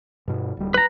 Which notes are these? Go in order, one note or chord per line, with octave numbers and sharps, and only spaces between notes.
G2 B2
D1 G3
B4 A#5